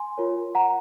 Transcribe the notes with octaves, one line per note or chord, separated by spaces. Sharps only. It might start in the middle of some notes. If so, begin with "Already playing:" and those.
Already playing: G#5 C6
F4 A#4 C#5
F#5 A#5